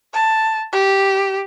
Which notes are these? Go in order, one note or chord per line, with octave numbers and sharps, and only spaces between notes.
A5
G4